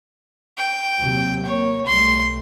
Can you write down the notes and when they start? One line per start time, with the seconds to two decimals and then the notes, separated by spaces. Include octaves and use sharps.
0.57 G5
0.99 D#2 C3 F#3
1.45 A#3 C#5
1.86 B1 G3 A3 C6